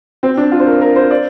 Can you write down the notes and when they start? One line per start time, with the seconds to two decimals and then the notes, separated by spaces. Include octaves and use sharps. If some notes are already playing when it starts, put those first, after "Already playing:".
0.23 C4
0.37 D4
0.52 F4
0.60 C5
0.67 A#4
0.81 A#4
0.96 C5
1.11 D5